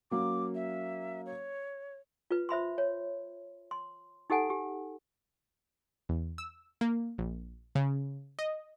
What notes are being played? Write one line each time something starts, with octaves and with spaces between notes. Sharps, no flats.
F#3 A#3 C#4 D6
E5
C#5
F4 B4
C5 E5 B5 C6
C#5
C6
D#4 G4 A4 F#5 G#5
G4
E2
E6
A#3
A#1
C#3
D#5